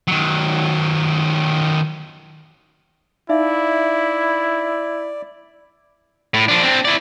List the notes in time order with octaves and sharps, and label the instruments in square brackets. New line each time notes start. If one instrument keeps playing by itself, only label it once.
[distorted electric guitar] D#3 F#3
[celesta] D#4 E5 F5 [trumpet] E4 [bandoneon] D5
[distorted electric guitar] A2
F3 D4
C4 D4
E4 D5